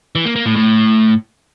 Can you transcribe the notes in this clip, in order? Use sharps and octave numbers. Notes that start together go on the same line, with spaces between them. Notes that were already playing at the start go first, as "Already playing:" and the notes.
E3
A#3
A#3
A2
A2